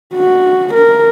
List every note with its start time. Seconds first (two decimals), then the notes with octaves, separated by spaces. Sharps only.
0.15 F#4
0.74 A#4